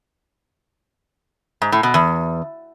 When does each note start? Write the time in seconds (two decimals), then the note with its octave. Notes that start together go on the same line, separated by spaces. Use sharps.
1.62 G#2
1.72 A2
1.83 B2
1.94 E2